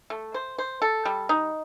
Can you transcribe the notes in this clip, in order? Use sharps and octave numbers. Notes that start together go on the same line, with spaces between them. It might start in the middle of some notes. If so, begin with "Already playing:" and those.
A3
C5
C5
A4
G3
D#4